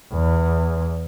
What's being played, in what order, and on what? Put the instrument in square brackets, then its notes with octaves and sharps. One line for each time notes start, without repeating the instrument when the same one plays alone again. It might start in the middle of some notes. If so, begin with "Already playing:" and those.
[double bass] E2